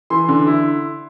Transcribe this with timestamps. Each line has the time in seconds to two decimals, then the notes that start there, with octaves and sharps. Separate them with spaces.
0.10 E3 C6
0.28 D3
0.47 E4